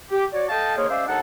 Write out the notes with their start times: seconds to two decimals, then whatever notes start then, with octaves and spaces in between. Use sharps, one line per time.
0.10 G4
0.32 F#4 C#5 D5
0.49 A4 D#5 F5 G5 A5
0.76 D#3 A#3 G#4 A#4 C5 C#5
0.89 G#3 C#4 C5 D5 E5 F5
1.07 D#2 D4 D#4 A4 F#5